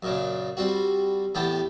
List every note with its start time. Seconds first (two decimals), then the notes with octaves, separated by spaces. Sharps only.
0.03 F#2 A#2 C#3
0.57 G3 C4 F#4
1.35 E2 A2 B3 G4 G5 A5